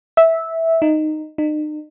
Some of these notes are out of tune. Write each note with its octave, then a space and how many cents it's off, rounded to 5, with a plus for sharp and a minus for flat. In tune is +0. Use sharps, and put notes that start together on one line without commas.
E5 -10
D#4 -10
D#4 -40